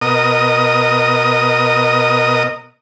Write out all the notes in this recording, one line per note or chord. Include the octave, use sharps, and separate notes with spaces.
B2 A#4 D#5 D#6